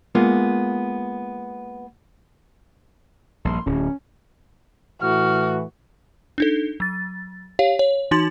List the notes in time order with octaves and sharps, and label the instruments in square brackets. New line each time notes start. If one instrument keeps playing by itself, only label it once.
[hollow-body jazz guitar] G#3 A#3 B3 F4
[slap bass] A#1 G2 [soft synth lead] C6
[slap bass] D1 [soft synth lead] C#4
[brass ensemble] A2 E3 [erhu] F#4 [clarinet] F6
[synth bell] D4 D#4 A4
F#3 A6
G4 C#5 F5
C#5
E3 D#4 F#4 C6 A6 F#7